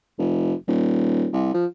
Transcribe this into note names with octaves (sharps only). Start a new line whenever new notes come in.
F1
D#1
C2
F3